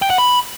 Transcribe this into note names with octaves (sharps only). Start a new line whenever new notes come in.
G5
F#5
B5